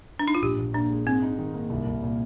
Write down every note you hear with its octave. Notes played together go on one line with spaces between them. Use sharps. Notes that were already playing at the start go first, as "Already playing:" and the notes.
D4
D#4
F4
A#1 G4
A#1
A#2 D4
G#3
G#2 C4
D#4
D#3
A#3
C2
C2
A#2